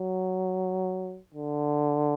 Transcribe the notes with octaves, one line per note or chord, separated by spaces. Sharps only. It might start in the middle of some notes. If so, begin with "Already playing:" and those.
Already playing: F#3
D3